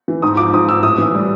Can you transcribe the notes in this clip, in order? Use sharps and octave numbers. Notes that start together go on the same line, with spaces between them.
E3
G#2 D#6
F3 D6
G#2 D#6
F3 E6
A2 D#6
E3
G3